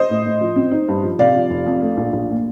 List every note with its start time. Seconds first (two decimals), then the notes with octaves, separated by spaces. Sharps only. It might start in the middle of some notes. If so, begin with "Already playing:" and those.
Already playing: C5 D#5
0.10 A2
0.26 A2
0.41 F3
0.56 C4
0.72 D#4
0.88 G2
1.03 F3
1.19 C3 D5 F5
1.35 F3
1.50 F1
1.66 F2
1.82 A3
1.97 A#1
2.13 A#1
2.30 A#2